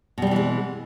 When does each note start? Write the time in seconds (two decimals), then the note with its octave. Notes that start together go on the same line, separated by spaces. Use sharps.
0.18 B2
0.22 G3
0.27 C4
0.31 E3
0.36 G#3